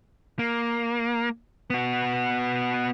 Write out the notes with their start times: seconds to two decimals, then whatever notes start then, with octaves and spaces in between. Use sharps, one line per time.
0.39 A#3
1.70 B3 F#4